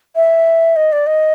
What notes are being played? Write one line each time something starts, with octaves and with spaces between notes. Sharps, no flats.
E5
D#5
D5
D#5